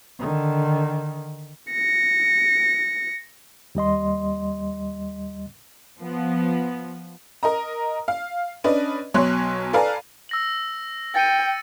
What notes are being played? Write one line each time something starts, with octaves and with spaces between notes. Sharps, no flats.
D3 D#3
A#6 C#7
D#2 G3 D#5 C6
F3 B3
A#4 D#5 A#5
F5
C#4 D4 B4 D5 D#5
B1 B2 F#3 C#5 C6 F#6
A4 B4 D5 F5 G#5 A#5
E6 A#6 F#7
G5 A6 C#7 D#7